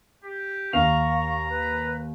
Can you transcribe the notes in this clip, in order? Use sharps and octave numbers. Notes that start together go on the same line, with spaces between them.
G4
D#2 F5 A#5 C#6
B4